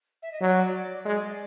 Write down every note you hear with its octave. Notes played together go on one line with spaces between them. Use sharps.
E5
D#5
F#3 D5
G#3 D5